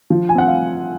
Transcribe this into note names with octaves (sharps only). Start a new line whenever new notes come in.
F3
G#5
C4 F#5
F5